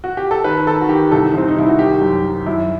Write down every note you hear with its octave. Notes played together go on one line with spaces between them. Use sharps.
F#4
G4
A4
D#3 B4
D#3 A4
F#4
D#3 G4
C2 A4
C2 C4
D#4
C2 E4
F#4
D#3 G4
F#2
D#3
F#2 E4